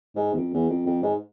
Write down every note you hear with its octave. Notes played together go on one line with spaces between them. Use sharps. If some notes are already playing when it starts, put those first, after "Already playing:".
G#2
E2
F2
E2
F2
F2
G#2